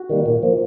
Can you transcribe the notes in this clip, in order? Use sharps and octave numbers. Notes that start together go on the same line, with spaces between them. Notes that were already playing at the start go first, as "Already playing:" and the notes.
Already playing: F#4
D#3 G3 A#3
A#2
F3 A#3